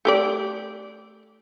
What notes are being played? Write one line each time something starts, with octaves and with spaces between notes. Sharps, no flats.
A3 G4 D5